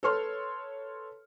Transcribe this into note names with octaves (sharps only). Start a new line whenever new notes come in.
A4 B4 C#5 C6 F6